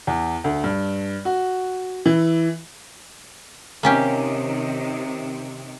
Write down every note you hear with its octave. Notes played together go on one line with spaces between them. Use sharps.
E2
D2
G2
F#4
E3
C3 D#3 A#3 C#4 G4